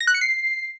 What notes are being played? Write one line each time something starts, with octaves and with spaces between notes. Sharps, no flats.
A#6
F#6
C#7
C7